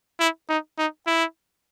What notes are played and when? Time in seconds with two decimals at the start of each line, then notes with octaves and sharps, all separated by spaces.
0.20 E4
0.49 D#4
0.78 D#4
1.07 E4